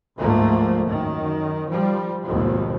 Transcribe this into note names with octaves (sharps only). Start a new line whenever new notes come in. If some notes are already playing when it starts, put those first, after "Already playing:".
D2 G#2 F3 A3 A#3
F#2 D#3
F3 G3
G#1 D#2 B2 F3